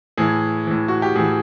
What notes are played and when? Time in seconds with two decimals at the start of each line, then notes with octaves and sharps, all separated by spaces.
0.17 A2 E3 G#4
0.67 A2 E3
0.88 F#4
1.02 G4
1.15 A2 E3 G#4